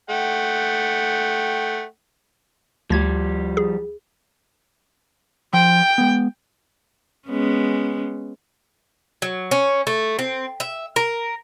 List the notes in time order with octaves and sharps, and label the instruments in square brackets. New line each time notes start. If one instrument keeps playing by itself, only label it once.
[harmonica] A3 F#5 G5
[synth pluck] D2 G#6 [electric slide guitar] F3 G3
[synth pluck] G#4
[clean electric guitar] F3 C6 [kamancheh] G5
[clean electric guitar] G#3 B3
[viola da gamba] G#3 B3 C#4
[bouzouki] F#3
C#4
A3
C4
E5
A#4